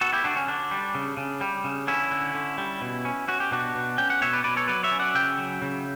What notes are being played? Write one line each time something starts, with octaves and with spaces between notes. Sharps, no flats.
B3 F#4 A4
E4 G4
D3 D4 F#4
C#4
D3 D4
G3
C#3
C#3
G3
C#3
D3 C#4 E4
D3
D3
G3
B2
C#4
C#4 F#4
G4
B2 D4 F#4
B2
C#4 G5
F#5
B2 C#5 E5
B4 D5
B2 B4 D5
A4 C#5
F#3 B4 D5
C#5 E5
C#4
D5 F#5
C#3 E5 G5
F#3
C#3